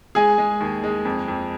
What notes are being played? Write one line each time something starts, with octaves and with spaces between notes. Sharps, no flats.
G#3 G#4 G#5
G#3
D#2
G#3
F2
F2